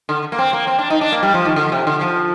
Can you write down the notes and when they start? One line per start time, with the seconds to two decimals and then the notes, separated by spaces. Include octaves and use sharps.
0.09 D3
0.32 A#3
0.39 C4
0.53 A#3
0.67 C4
0.78 D4
0.90 D#4
1.01 D4
1.12 A#3
1.23 G3
1.34 F3
1.45 D#3
1.56 D3
1.72 C3
1.87 D3
2.01 F3